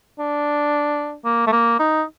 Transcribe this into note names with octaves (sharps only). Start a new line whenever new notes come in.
D4
A#3
A3
A#3
D#4